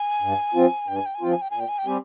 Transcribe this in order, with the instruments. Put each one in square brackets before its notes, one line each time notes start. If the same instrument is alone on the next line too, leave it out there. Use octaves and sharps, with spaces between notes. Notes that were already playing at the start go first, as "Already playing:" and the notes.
Already playing: [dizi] G#5
[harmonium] G2
F3 C4 F4
[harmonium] G2 [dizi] G5
[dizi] G#5
G5
G#5
[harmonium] F3 C4 F4 [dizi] G5
[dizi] G#5
G5
[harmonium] A#2 [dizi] G#5
[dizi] G5
G#5
G5
[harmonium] G3 C4 G4 [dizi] G#5